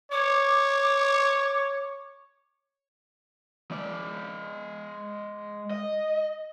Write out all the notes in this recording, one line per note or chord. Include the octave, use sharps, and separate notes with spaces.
C#5 D6
G#3 D5
D#5